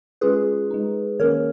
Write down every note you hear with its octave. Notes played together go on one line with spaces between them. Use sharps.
G#3 C#4 F4 G#4 B4
G#3 D#4
D#3 A#3 C#4 A#4 C#5